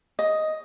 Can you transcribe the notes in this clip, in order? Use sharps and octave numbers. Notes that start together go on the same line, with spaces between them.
D#5